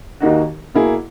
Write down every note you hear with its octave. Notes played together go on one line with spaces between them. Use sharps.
D#2 D#3 A#3 D#4 F#4
B2 A#3 E4 G#4